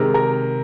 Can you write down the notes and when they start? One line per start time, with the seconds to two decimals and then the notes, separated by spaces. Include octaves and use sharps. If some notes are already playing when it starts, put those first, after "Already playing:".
Already playing: C3 D#3 G#3 A#4
0.14 A#4